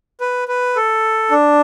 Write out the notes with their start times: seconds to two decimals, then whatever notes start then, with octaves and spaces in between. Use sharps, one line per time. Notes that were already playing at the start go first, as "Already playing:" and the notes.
0.21 B4
0.48 B4
0.76 A4
1.31 D4